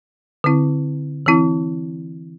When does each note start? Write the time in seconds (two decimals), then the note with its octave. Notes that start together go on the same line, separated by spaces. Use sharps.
0.44 D3 C4 E4
1.26 E3 C4 E4